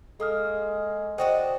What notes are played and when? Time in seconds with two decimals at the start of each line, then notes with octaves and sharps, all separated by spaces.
0.20 G#3 A#3 A4 D#6 F6
1.18 D4 F#4 C5 D#5 G5